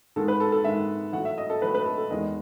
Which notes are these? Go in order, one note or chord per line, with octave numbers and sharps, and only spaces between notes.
G#2 D#3 G#3 A4
B4
A4
A4
G#2 D#3 G#3 E5
A2 F#3 A3 F#5
E5
D#5
A4
A2 F#3 A3 B4
B4
A4
A4
E2 D#3 G#3 B3 D#5